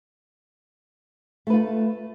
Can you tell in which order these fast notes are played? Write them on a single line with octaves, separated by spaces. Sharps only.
A3 B4 F4